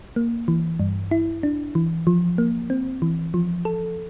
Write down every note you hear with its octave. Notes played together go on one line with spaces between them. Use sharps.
A#3
E3
G2
E4
D4
E3
F3
A#3
C4
E3
F3
A4